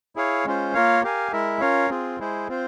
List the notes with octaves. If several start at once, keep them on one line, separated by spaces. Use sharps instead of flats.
E4 G#4 C#5 F5
G#3 C#4 F4 C5
A#3 F4 A#4 C#5 F5
G4 A#4 F5 G#5
G#3 E4 A#4 E5
C#4 F4 A#4 C#5 F5
C4 F4 G#4
G#3 E4 G#4 C5
C4 F4 C5